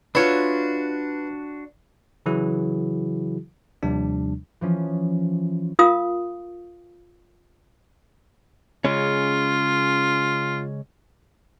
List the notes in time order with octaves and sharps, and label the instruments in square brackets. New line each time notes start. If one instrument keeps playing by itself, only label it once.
[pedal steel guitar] D4 F#4 [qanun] F4 C#5 E5 [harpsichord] B4
[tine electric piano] C#3 E3 F#3 E4 F#4 G#4
D#2 C3 F3 G3 D4
[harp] E3 F3 C#4
[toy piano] F4 A#4 F5 D#6
[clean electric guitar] C#3 G#3 C#4 [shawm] F4